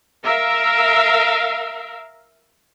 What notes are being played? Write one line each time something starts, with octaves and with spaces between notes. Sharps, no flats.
A#4 E5 F5